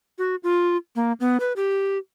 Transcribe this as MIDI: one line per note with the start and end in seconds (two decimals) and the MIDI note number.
0.18 0.36 66
0.43 0.77 65
0.96 1.12 58
1.20 1.37 59
1.40 1.53 71
1.56 1.98 67